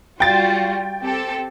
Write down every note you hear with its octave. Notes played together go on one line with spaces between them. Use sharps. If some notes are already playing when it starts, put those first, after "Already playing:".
G3 F4 F#4 G5 A6
C4 G4 A4